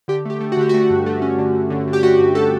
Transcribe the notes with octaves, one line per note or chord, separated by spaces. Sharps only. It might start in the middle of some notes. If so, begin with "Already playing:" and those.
D3 G4
A3 G4
A3
F#4
D3 G4
A3 F#4
G2
A3
C#4
D3
D3
D3
D3
G4
A3 F#4
G2
A3 A4